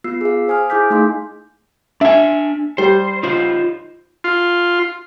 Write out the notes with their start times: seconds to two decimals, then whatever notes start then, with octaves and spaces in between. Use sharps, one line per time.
0.04 B3 F4 E6 C7
0.21 G#4 F5
0.48 C5 G#5 D#6 F6
0.70 E4 G#4 G#5 D6 G6 B6
0.90 A3 D#4 G#4 F5 C6
2.01 D4 E5 G#5
2.78 G3 C5
3.23 D#4 F4 C5
4.24 F4